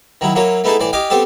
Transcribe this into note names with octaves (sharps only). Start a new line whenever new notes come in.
D#3 F#3 E4
F#3 A#3 E4 C#5
A3 B3 D#4 E4 G#4 A4
A2 E3 D5
G4 D#5 F5 G5 G#5
B3 C4 G4 A4